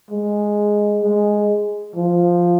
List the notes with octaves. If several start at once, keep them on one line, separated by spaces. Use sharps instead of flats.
G#3
G#3
F3